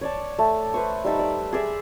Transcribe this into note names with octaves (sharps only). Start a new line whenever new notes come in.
C#5 D5 A5
A3
B4 C5 C#6
G3 D#4 E5 A5
D5
G#4 D5 E5